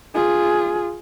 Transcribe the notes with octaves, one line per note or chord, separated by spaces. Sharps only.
F4 G#4